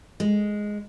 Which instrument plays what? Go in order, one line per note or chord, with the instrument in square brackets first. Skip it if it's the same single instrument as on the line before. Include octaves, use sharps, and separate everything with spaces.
[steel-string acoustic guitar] G#3